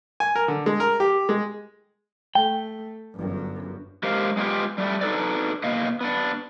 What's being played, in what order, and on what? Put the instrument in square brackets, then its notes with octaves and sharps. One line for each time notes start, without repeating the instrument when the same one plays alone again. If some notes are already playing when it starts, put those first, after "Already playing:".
[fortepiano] G#5
A#4
D3
G#3
A#4
G4
G#3
[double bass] A3 [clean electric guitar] G5
[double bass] G1 F#2
[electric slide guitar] G#3 G4 A#4 C5 F5
G#3 A3 B3 F4 G4
G3 A3
D4 D#4 A4 B4 D5
B2 A#3 D#5 F5
B3 D4